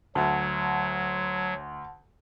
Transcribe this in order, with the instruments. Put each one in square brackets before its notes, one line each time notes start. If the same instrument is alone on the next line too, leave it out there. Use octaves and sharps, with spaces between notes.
[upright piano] D2 [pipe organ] F#3 [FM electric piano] F#5 A5